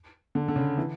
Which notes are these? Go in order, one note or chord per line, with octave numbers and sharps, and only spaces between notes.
D3
D3
C#3
E3